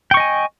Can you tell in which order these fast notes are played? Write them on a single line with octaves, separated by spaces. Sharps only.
G5 C#6 D#5 G#5